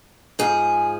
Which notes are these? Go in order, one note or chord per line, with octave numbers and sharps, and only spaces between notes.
G#2 F3 G#4